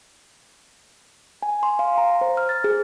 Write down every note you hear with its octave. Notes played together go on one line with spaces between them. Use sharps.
G#5
C6
F5
A#5
C5
F6
A6
G#4